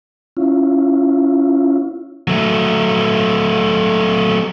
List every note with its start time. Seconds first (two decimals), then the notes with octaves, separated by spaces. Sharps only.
0.37 C#4 E4 F4
2.28 F#3 A3